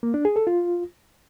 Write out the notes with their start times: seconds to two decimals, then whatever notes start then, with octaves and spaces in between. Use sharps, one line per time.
0.03 A#3
0.14 D4
0.25 G#4
0.36 A4
0.47 F4